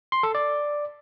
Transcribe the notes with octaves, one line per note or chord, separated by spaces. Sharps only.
C6
A4
D5